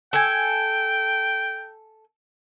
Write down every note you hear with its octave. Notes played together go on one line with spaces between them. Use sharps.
A4 G5 G#5